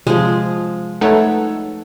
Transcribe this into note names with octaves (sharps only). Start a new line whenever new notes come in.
C3 F3 G#3
A3 D#4 A4 B4 C#5 F#5